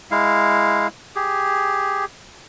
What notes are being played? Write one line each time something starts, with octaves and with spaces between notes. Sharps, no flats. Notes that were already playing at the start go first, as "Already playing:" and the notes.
G#3 E4 F5
G4 G#4